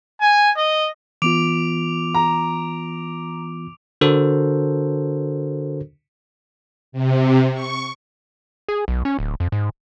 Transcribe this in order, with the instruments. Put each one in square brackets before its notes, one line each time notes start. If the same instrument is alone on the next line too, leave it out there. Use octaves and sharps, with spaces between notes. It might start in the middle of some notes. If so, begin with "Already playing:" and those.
[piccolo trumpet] G#5
D#5
[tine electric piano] E3 B3 F4 [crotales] D6 D7 F7
[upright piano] A#5
[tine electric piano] D3 D4 F#4 A4 A#4 C5
[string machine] C3
C#6
[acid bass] G#4
B1
C#4
D1
F2
G#2